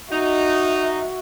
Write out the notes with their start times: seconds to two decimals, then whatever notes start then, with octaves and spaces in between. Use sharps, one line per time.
0.12 D#4 F#4 E5